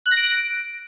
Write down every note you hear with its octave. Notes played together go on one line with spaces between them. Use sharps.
F#6
A#6
D7